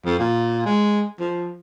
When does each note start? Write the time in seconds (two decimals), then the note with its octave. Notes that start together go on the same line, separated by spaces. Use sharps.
0.06 F2
0.19 A#2
0.66 G#3
1.20 F3